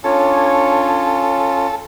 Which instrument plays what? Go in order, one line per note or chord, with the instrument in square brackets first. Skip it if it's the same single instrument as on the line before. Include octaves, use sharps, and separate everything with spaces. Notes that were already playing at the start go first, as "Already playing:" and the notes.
[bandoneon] C#4 F4 [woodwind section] D4 C#5 [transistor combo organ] A4